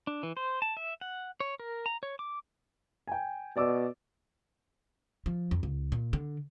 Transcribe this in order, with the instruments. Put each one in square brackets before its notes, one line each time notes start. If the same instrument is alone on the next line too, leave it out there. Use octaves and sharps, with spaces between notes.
[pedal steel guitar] D4
E3
C5
A5
E5
F#5
C#5
A#4
A#5
C#5
D6
[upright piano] G5 G#5
[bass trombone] B2 [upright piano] D5 D6 E6
[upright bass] F3
F2
C#2
A#2
D3